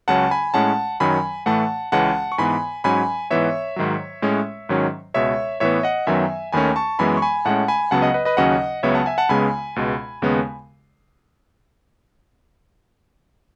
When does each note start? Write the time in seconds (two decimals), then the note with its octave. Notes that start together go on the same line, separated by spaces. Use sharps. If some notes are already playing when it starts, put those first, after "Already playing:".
0.08 C#2 C#3 F#3 C#4 F#5 A5
0.31 G#5 B5
0.54 A2 G#3 C#4 F#5 A5
1.00 F#2 D#3 F#3 C#4 G#5 B5
1.46 A2 E3 A3 F#5 A5
1.92 C#2 C#3 E3 G#3 C#4 F#5 A5
2.32 C#6
2.38 G#2 E3 B3 G#5 B5
2.84 G#2 F#3 C#4 G#5 B5
3.30 G#2 E3 B3 C#5 E5
3.76 G#2 D#3 F#3
4.22 A2 G#3 C#4
4.69 G#2 D#3 F#3 C#4
5.14 C#2 B2 G#3 C#5 E5
5.60 A2 E3 B3 C#5 E5
5.83 D#5 F#5
6.07 F#2 D#3 F#3 B3 E5 G#5
6.52 D#2 D#3 A3 C#4 G#5 B5
6.76 A5 C#6
6.99 F#2 E3 G#3 B3 G#5 B5
7.17 C#6
7.22 G#5 B5
7.45 A2 G#3 C#4 F#5 A5
7.68 G#5 B5
7.91 C#2 C#3 F#3 B3 F#5 A5
8.02 D#5 F#5
8.14 B4 D#5
8.25 B4 D#5
8.37 D#2 C#3 F#3 C#4 D#5 F#5
8.83 C#2 C#3 F#3 B3 C#5 E5
8.95 F#5 A5
9.06 E5 G#5
9.18 F#5 A5
9.29 C#2 C#3 G#3 B3 G#5 B5
9.76 C#2 B2 G#3
10.22 D#2 C#3 G#3 B3